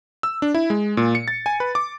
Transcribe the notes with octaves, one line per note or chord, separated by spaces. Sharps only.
E6
D4
E4
G#3
A#2
C#7
A6
G#5
B4
D6